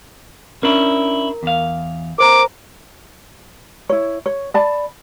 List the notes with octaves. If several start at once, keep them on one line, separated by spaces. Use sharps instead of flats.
C#4 D4 E4 A#4
E2 F5
A#4 C5 A#5 D6
E4 C#5
C#5
D5 A5 B5